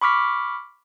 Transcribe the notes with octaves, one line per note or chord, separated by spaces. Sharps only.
B5 C#6 D6 F6 B6